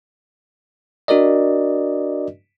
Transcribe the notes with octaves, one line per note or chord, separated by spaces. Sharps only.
D4 F#4 A#4 D5 D#5